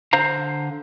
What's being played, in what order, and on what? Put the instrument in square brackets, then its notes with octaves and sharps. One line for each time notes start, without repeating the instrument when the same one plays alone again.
[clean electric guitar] D3 C5 F5 A#5